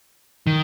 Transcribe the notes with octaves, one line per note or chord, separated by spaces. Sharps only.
D#3